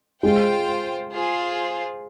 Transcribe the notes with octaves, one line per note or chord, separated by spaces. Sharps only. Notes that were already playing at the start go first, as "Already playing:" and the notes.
G#3 F4 C5 G5
F4 G#4 C5